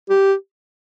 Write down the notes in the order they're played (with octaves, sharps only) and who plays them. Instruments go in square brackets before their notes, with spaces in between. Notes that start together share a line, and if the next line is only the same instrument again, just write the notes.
[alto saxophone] G4